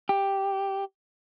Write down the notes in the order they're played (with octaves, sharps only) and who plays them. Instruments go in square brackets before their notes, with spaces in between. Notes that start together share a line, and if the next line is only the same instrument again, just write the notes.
[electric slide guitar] G4